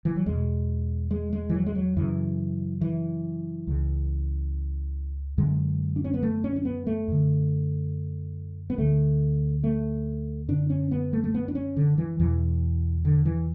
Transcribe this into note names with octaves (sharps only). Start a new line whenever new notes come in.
E3
F#3
E2 B2 G#3
G#3
G#3
E3
F#3
G#3
F#3
F#2 C#3 E3
E3
C#2 C#3
F#2 D3 G#3
D4
C#4
B3
A3
C#4
C#4
B3
A3
F#2 D3
B3
D2 D3 A3
A3
F#2 D3 D4
C#4
B3
A3
A3
B3
D4
C#4
D3
E3
E2 B2 E3
D3
E3